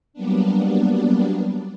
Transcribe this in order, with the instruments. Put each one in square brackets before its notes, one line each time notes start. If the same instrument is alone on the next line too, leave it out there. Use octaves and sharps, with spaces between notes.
[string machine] F#3 G3 A#3 B3 D4